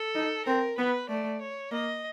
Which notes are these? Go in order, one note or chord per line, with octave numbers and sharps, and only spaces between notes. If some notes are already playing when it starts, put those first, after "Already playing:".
Already playing: A4
D#4
C4 A#4
B3 B4
A3 D5
C#5
A#3 D#5